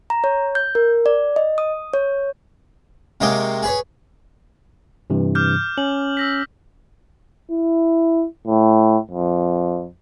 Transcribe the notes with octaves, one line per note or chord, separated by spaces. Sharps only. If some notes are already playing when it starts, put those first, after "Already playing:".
A#5
C#5
G6
A#4
D5
D#5
D#6
C#5
C3 G#3 A#3 C#5 D#5 G5
G#4 B4 C#5
G2 C3 E3
D6 F6 G6
C#4 F#7
E6 A#6 B6
E4
A2
F2